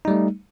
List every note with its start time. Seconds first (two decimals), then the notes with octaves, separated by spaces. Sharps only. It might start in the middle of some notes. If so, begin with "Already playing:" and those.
0.05 D#4
0.08 G3
0.10 A3